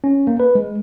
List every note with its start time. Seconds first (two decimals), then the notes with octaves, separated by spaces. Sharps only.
0.04 C#4
0.27 A#3
0.40 B4
0.55 G#3